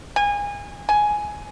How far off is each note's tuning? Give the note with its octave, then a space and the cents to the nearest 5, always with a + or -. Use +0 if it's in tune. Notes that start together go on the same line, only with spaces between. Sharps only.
G#5 -25
G#5 +10